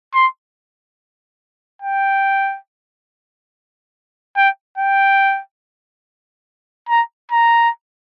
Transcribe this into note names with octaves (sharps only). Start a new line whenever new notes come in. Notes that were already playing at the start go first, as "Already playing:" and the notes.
C6
G5
G5
G5
A#5
A#5